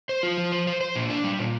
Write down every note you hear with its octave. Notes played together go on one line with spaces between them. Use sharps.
C5
F4
F3
C5
C5
C5
A#2
D4
G3
A#2